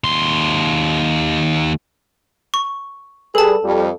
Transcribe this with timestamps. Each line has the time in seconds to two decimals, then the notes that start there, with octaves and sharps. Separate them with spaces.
0.04 D#2 C6
2.54 C#6
3.35 G3 G#4 A4 B4 A5
3.64 F2 G3